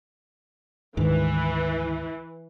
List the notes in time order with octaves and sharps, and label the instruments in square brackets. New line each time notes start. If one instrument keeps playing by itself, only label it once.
[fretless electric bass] D2 G#2 D#3 [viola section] E3